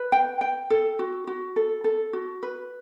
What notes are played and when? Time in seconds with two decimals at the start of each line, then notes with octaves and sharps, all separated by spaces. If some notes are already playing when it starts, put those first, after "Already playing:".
Already playing: B4
0.12 G5
0.41 G5
0.70 A4
0.99 F#4
1.27 F#4
1.56 A4
1.84 A4
2.13 F#4
2.43 B4